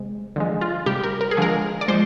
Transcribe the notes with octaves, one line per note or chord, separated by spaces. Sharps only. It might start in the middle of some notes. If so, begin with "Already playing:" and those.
Already playing: C3 G#3
D3 F3 G#3
F4
C3 G3 G4
A#4
A#4
G#4
D3 F3 G#3 A#4
D5
F3 G#3 C5